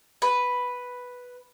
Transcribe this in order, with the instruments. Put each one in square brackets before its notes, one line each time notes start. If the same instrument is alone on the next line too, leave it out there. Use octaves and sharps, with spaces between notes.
[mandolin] B4